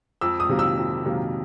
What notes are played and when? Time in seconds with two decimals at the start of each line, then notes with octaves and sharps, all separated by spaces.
0.21 F2 E6
0.40 D#6
0.49 C3 D#3 F#3 A#3
0.59 E6
0.77 F2
1.05 C3 D#3 F#3 A#3